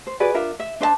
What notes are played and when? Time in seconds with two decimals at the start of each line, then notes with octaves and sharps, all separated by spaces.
0.07 C5
0.20 F#4 G#4 B4 D5
0.34 D4 F4 A#4 E5
0.60 E5
0.80 D4 C5 E5 A5